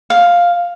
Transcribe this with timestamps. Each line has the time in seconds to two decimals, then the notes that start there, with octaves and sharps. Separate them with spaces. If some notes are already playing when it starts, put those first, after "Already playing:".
0.10 F5